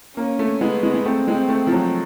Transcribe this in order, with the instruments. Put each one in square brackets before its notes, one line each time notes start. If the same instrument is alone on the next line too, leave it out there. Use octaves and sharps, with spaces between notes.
[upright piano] A#3 [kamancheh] C#4
[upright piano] A3
[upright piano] G#3 [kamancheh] B3
[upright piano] G#3
G#3
[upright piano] A3 [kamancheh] C4
[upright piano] G#3
A3
F3
F#3